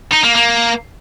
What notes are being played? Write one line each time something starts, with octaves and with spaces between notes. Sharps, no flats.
D#4
A#3
A#3